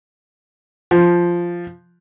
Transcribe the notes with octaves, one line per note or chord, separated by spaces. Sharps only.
F3